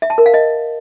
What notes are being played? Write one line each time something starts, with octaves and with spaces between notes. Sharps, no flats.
E5
A5
A#4
F5
D#5